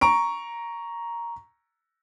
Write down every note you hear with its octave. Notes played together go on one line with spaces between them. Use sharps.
A#5 C#6 D7